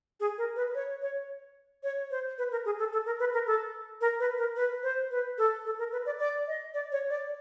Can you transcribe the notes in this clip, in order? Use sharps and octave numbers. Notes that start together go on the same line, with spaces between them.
G#4
A#4
B4
C#5
C#5
C#5
C5
B4
A#4
G#4
A4
A4
A#4
B4
A#4
A4
A#4
B4
A#4
B4
C5
B4
A4
A4
A#4
B4
D5
D5
D#5
D5
C#5
D5